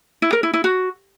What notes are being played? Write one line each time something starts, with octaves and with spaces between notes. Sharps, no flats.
E4
A#4
E4
E4
F#4